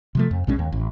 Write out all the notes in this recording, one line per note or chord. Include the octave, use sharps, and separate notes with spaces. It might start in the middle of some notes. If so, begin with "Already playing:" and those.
C3 F3 A3
F2
A#1 B2 G#3 C#4
D#2
A1